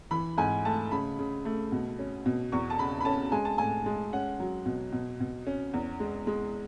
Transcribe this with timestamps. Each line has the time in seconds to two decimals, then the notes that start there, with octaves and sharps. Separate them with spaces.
0.11 E3 B5
0.38 G#2 G#5
0.65 A3 A5
0.92 C#3 B5
1.19 C#3
1.45 A3
1.72 B2
1.99 C#4
2.26 B2
2.52 E2 C#6
2.70 A5
2.79 C#3 B5
3.01 B5
3.05 C#4 A5
3.32 G#3 G#5
3.45 A5
3.58 A2 G#5
3.86 G#3
4.13 C#4 F#5
4.40 F#3
4.66 B2
4.92 B2
5.20 B2
5.47 C#4
5.74 E2
6.00 G#3
6.27 G#3